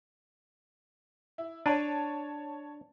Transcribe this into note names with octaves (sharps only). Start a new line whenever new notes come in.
E4
D4 C#5 A5 D#7